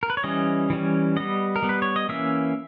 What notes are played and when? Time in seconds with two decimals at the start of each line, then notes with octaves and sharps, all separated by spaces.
0.03 A#4
0.10 B4
0.17 C#5
0.24 E3 G3 C#4 D#5
0.70 E3 G3 C#4
1.16 G3 B3 D#5
1.56 A#4
1.63 G3 B3
1.69 B4
1.82 C#5
1.96 D#5
2.09 E3 A#3 C#4 E5